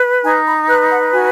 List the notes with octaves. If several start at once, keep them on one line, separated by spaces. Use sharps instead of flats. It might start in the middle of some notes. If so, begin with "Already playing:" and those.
Already playing: B4
D#4 G#5
B5
B4 F#6
F#5
F#4 G#5